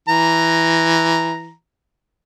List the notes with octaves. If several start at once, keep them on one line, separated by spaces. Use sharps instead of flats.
E3 A#5